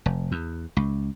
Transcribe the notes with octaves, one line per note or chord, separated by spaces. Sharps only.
F1
E2
C#2